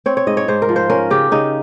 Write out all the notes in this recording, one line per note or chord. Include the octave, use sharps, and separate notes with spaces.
C4 C#5
C#5
G#2 D#5
C#5
G#2 C5
A#4
F3
C5
C#4 A#4
C#3 G4
C#3 D#4